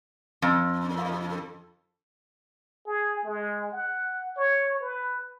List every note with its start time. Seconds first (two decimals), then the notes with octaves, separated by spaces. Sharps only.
0.42 F2
2.87 G#4
3.25 G#3
3.72 F#5
4.37 C#5
4.81 B4